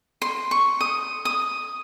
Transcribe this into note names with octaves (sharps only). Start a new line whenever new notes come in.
C6
C#6
D#6
D#6